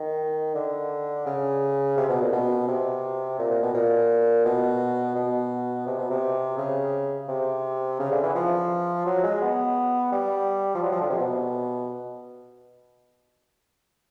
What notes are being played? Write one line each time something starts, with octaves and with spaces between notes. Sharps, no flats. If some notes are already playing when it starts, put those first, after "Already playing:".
Already playing: D#3
D3
C#3
C3
B2
A#2
B2
C3
A#2
A#2
B2
A#2
B2
B2
C3
B2
C3
C#3
C3
C#3
D3
E3
F3
F#3
G#3
B3
G3
F3
F#3
F3
D3
C3
B2